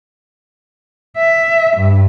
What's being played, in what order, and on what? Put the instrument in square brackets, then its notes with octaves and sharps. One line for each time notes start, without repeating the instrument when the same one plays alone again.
[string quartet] E5
G2